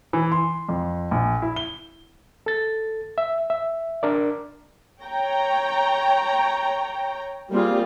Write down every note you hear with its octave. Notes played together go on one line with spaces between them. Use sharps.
E3
C6
F2
A#1
E4
G7
A4 A6
E5
E5
D4 A#4 D5
C#5 G5 A#5
G3 A#3 C4 F4 G#4